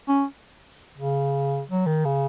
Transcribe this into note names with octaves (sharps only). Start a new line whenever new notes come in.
C#4
C#3
F#3
D#3
C#3